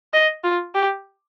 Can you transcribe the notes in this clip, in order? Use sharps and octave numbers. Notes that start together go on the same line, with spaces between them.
D#5
F4
G4